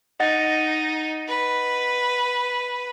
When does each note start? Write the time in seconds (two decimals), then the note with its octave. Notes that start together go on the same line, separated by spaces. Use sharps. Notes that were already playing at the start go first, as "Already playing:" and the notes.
0.20 D#4 D#5 F#5 A6
1.28 B4